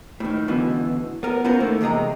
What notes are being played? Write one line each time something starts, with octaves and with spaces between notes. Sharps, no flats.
A2 D#3
C#2 B2 D3 E3
B3 A#4
B3 C#4 E4 F4 A#4 C5
D#3 A3 A#3
E2 C3 G#3 D#5 A#5